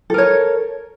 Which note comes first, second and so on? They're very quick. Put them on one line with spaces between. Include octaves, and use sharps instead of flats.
A4 A#4 C#5